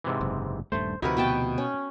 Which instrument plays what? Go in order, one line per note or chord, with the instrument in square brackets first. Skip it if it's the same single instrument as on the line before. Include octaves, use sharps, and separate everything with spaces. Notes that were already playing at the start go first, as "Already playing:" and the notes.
[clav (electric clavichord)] G#2 C3 E3
[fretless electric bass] F#1
[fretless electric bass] D#1 G2 A3 [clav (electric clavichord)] C5
[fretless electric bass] D2 C3 F3 [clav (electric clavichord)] D#4 E4 [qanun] F#4 A#4 B4
[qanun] B2 G5 A5
C#4